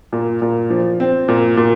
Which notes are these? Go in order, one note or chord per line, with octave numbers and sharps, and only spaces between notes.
A#2
A#2
F3
C4
A#2
A#2